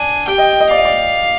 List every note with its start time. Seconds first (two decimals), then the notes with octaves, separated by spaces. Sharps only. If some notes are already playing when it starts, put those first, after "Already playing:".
Already playing: D4 G#5
0.28 G4 G5
0.38 D#5
0.60 D#5
0.71 D5 F5
0.78 D#5
0.85 D5